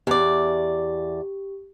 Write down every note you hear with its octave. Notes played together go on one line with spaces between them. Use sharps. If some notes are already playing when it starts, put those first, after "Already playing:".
E2 G4 D5